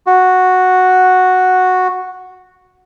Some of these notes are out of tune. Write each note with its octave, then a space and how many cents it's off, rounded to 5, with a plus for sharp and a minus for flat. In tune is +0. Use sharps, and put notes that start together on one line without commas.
F#4 -5